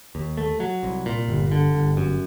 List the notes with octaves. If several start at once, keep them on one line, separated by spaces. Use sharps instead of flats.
D#2
A3
F#3
C2
A#2
G1
D3
G1
F#2